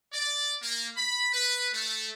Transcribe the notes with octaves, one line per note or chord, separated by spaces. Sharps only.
D5
A#3
B5
B4
A3